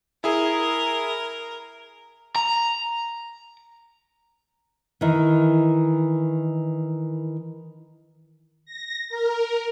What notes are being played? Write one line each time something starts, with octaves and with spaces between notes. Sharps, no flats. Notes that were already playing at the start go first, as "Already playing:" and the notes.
E4 G#4 A#4
A#5
D#3 E3
A#6
A#4